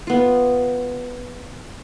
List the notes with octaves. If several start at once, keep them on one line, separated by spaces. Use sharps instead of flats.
B3 F4